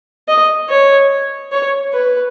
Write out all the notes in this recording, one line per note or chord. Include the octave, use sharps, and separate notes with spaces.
D#5
C#5
C#5
B4